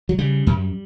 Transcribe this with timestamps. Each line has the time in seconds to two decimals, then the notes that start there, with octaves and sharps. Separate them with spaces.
0.09 F#3
0.18 C#3 G3
0.47 F#2